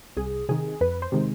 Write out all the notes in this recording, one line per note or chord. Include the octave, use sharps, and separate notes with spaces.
C2 G#4
C3 D#3 G#4
F2 B4
C5
C3 D#3 G#3